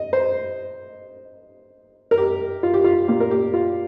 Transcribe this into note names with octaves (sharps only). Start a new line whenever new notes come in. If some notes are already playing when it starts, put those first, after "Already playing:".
Already playing: D#5
C5
A#4
G4
F4
G4
F4
A#2 A#3 F4 G4
A#4
G4
F4